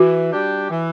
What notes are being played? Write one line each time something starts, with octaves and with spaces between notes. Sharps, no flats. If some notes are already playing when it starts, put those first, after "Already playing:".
Already playing: E3 F#4
G3 D4 G4
E3